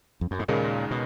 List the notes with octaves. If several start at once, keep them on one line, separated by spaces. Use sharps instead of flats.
F2
F#2
G#2
D#2 A#2 C#3 G#3 D#4 A#4
B2